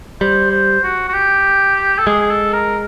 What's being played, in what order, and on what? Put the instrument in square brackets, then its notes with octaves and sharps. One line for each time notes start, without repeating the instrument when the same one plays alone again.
[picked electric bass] G3 [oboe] C5
[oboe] C5
F#4
F#4
G4
A4
[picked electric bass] G#3 [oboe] G#4
[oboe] G#4
A4
A#4